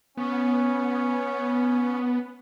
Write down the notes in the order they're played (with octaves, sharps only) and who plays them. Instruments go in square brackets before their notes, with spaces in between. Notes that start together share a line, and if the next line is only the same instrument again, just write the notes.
[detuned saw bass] B3 [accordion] C#4